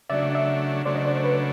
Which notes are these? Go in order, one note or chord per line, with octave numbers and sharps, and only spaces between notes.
C#3 F#3 A3 D4 D5 E5
D5 E5
C#3 F#3 A3 D4 C5 D5
D#5
C5 D5
B4 C#5